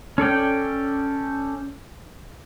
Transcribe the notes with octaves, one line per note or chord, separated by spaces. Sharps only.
C#4 A4 D5 G5